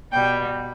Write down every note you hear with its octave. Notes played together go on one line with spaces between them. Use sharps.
B2 G3 G5